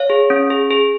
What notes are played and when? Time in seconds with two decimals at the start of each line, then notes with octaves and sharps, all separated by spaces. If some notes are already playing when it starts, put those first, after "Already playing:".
Already playing: C#5 F5
0.10 G#4
0.30 C#4
0.50 G#4
0.70 G#4